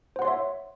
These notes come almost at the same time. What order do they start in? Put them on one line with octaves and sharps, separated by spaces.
C5 F#5 C6 C#5 E5